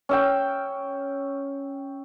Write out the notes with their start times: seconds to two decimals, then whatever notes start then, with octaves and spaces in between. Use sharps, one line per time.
0.09 C#4 E5 G5